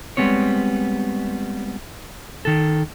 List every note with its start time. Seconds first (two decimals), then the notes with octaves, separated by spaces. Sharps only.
0.17 G3 G#3 B3 C4 C#5
2.45 D#3 A4